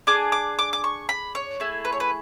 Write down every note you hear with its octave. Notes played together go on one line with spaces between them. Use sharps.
D4 G#4 D6
D6
D6
D6
C#6
B5
C#5
A3 E4 G#4
B4
C#5
B4